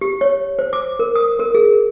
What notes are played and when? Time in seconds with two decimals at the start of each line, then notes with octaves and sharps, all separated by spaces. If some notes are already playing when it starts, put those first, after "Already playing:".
0.01 G4
0.21 C#5
0.59 C5
0.73 D6
0.99 A#4
1.15 D#6
1.39 A#4
1.55 G#4